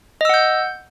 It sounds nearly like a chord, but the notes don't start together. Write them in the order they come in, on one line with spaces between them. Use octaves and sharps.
D#5 E6 F#5 G6